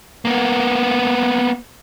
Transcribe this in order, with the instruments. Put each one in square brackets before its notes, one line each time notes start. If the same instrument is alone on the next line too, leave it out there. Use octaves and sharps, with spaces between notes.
[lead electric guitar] A#3 B3